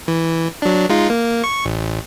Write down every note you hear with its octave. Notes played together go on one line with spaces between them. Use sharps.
E3
F#3 D4
G#3 D#4 F4
A#3
C#6
A1